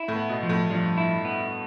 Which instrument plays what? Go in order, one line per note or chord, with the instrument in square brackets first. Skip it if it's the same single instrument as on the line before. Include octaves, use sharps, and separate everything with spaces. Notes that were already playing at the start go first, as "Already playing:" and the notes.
Already playing: [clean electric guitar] E4
[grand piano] A2
[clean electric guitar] B3
[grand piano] B2
[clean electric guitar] F3
[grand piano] A2
[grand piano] G2 [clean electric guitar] F3
[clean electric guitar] E4
B3